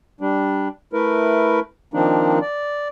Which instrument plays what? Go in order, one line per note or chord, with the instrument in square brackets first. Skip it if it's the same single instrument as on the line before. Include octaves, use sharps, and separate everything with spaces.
[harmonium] G3 D4
A3 E4 A#4 B4
D#3 F3 A#3 C4 D4 D#4
D5